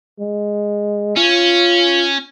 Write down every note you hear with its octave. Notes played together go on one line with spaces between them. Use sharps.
G#3
C#4 F4